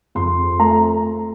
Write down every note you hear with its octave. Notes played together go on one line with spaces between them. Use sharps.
F2 C6
A3 A#5